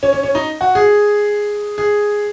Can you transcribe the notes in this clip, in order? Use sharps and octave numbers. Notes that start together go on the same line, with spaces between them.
C#4
C#4
C#4
D#4
F#4
G#4
G#4